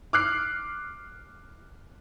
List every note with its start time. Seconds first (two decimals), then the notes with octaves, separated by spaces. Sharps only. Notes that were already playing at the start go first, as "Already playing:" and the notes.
0.13 D6 F6 F#6 C7